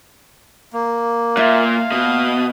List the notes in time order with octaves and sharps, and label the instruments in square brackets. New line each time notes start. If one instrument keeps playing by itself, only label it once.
[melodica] A#3
[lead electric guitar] A#2 [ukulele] E5 [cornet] F5
[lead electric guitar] B2 [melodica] D#6